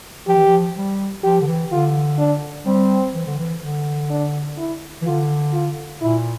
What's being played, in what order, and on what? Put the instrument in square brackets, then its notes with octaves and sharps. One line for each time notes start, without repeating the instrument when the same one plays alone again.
[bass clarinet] F3 [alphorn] G4
[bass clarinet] E3
F3
G3
[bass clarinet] F3 [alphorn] G4
[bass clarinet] D3
E3
[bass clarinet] D3 [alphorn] F4
[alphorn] D4
[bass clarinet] G3 [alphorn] C4
[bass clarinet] E3
D3
E3
D3
[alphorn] D4
E4
[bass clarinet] E3
[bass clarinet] D3 [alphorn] F4
[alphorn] F4
[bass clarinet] A#2 [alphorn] E4